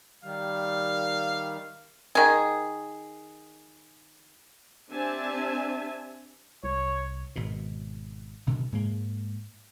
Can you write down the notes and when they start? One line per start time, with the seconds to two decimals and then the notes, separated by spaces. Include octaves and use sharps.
0.24 D#3 G3 F5
2.15 D#3 G#4
4.91 C4 D4 G4 E5 G#5 A5
6.64 C2 C#5
7.36 G#1 B2
8.46 F#1 B2 D3 D#3
8.72 G#2 G#3 A#3